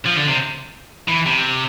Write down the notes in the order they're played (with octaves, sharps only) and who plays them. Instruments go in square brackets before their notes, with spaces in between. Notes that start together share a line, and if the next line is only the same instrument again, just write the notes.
[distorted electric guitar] F3
D3
C3
E3
C3